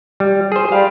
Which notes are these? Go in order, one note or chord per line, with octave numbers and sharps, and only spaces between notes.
G3
G#4 C5
G3 F5